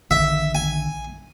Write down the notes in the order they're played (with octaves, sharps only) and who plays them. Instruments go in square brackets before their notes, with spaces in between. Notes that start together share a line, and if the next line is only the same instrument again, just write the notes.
[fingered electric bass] A#1 D3 D#3 [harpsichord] E5
[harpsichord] G#5